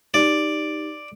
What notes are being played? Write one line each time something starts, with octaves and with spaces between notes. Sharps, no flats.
D#4 G4 D5